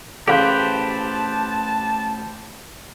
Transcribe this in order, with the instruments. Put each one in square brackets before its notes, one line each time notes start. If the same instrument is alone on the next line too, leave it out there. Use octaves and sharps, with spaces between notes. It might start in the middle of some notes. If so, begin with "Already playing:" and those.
[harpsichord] A1 [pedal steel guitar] G4 B4 C5 [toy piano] G#4 F5 [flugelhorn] A5